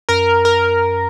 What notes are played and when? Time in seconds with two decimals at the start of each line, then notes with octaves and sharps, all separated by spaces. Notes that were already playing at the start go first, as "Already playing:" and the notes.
0.09 F#2 A#4
0.45 A#4